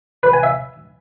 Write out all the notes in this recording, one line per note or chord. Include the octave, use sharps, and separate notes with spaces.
B4
G#5
E5